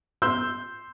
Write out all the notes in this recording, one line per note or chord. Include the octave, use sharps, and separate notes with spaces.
C6 E6 G6